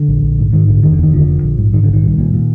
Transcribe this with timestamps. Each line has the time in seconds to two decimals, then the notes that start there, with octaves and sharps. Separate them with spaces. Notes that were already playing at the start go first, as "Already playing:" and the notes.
Already playing: D3
0.08 A#1
0.22 A#1
0.38 G#2
0.53 G#2 D#3
0.68 A#1 D3
0.83 F1 D#3
0.93 D3
0.98 D#2
1.03 D#3
1.13 F1 D3 F3
1.28 D3
1.43 A#1
1.58 G#2
1.73 G#2 D#3
1.83 D3
1.89 A#1 D#3
2.03 C2
2.18 A#2
2.33 A#2